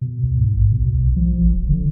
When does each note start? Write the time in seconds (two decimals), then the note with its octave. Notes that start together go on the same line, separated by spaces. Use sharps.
0.01 B2
0.23 D2
0.39 G#2
0.57 A#1
0.72 B2
0.85 D2
0.98 B1
1.16 F3
1.41 A1
1.55 D1
1.69 D3